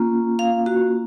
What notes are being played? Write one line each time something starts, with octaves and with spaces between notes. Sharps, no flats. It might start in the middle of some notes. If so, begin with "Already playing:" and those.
Already playing: A#3 C#4 F4
F5
F#4